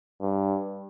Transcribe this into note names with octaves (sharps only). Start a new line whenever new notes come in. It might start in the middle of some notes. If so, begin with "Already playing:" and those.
G2